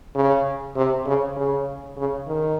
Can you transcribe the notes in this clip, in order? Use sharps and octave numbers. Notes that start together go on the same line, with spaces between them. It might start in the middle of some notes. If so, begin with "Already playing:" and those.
C#3
C3
C#3
C#3
C#3
D#3